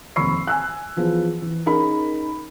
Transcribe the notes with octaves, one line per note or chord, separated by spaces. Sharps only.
F1 D#2 B5 C#6 E6 C7
G#5 E6 F#6
E3 F3 B3 G#4
E3
C#4 D#4 G#4 A#4 B5